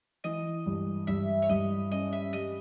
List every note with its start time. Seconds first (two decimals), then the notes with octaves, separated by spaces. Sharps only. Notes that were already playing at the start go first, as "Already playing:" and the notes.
0.24 E3 D#5
0.66 G2
1.07 G2 E5
1.42 C#5
1.49 G2 D#5
1.92 C#4 D#5
2.13 E5
2.33 G3 D#5